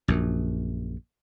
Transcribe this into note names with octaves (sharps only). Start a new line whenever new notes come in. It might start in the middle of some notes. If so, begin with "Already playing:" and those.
A#1 F#2